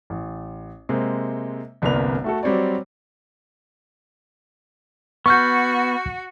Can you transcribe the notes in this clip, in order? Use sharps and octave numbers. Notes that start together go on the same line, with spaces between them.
A1
C3 G#3 A#3 C4
G1 C2 F2 A#3 B4 F7
A3 F#4 A4
F#3 G3 C4 C#5 D5
B3 F#4 C#6 F6 G6